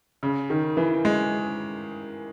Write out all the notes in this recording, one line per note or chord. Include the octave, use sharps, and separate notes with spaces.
C#3
D#3
E3
G#3